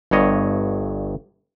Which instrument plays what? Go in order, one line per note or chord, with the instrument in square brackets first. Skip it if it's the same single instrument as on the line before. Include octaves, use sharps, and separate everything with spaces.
[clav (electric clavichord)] G1 G2 C#5 D#5